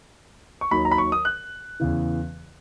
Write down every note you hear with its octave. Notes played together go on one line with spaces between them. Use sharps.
C#6
D#2 D#3 F#3 B5
A#5
B5
C#6
D#6
F#6
E2 C#3 E3